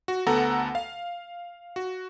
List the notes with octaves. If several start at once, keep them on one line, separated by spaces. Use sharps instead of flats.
F#4
D2 B3 A4 F#5 A#5
F5
F#4